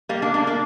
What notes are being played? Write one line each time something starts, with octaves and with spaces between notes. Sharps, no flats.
G3 A#3
A#3 D4
A#3 D4
A#3 D4